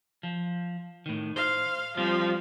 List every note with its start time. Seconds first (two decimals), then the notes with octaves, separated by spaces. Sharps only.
0.23 F3
1.06 A2 D#3
1.36 C5 F5
1.97 F3 G3 C4 F4